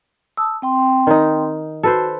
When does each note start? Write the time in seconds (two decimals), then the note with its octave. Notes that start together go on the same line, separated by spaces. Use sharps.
0.37 A5 D#6 E6
0.62 C4 G5 C6
1.07 D#3 D#4
1.83 F#4 A4 B4 C5